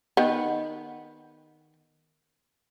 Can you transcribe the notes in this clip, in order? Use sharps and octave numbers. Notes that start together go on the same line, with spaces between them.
D#3 B3